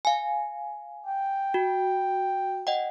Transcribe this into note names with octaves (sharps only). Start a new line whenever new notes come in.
F5 G#5
G5
F#4
D#5 F#5 G5